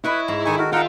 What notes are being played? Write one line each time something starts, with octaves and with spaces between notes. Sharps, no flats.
E4 B4 C#5 D#5
G#2 A#5
D#3 D#4 A4 G#5 C#6
F#4 A#4
D#4 F4 A#4 E5 F#5 G5